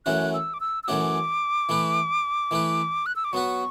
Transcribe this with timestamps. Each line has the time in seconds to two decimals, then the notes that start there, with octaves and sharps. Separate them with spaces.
0.06 F#2 E3 A3 C#4 F#4 F#6
0.34 E6
0.54 D6
0.60 E6
0.83 E6
0.88 F#2 E3 A3 C#4 F#4 D6
1.69 E3 A3 E4 B4
2.51 E3 A3 E4 B4
3.06 F#6
3.16 E6
3.24 D6
3.33 F#3 B3 F#4 B4 C#6